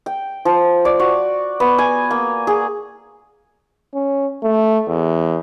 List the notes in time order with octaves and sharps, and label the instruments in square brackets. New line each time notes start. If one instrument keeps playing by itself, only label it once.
[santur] G5
F3
D5
F#4
B3
G#5
A#3
G#4
[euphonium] C#4
A3
E2